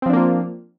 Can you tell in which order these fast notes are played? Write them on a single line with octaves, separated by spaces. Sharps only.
C4 F3 D4 A#3 F4